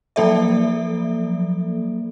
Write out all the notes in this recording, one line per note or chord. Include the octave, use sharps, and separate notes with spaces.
F3 F#3 A#3 A4 D5 E5